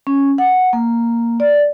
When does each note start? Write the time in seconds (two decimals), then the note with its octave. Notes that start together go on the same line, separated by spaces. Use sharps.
0.07 C#4
0.38 F#5
0.73 A#3
1.40 D5